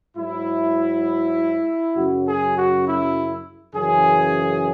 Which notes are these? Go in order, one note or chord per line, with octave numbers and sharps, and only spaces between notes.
G#2 F#3 E4
F#2 C#3 F#3 F#4
G#4
F#4
E4
F#2 C#3 E3 G#4